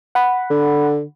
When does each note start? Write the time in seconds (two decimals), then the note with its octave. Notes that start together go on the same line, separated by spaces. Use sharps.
0.15 F#5 B5
0.50 D3